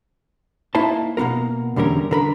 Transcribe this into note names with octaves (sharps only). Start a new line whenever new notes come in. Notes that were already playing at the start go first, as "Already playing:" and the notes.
A#3 D#4 E4 C5 A5
B2 A#3 B3 F4 A#4
E2 D3 G3 C#4 A#4
D3 A#4 B5